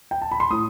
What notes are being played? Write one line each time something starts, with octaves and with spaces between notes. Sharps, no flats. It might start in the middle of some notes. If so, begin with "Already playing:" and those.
G5
A5
B5
C6
A2 D#6